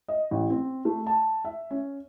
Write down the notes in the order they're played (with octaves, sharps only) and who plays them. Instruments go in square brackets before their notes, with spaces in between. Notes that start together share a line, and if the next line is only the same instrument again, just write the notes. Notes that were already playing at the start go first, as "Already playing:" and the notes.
[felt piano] D#5
A1
C4
A3
A5
E5
C#4